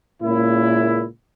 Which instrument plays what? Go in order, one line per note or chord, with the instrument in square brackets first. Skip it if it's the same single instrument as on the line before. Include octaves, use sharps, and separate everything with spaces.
[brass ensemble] C#2 A#2 C#3 A#3 E4